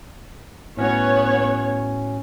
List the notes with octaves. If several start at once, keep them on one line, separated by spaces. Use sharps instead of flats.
A2 B3 C#4 F#4 C#5